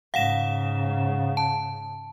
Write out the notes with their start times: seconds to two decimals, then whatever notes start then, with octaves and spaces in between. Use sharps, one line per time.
0.14 G#2 C#3 F5 F#5 E7
1.37 A5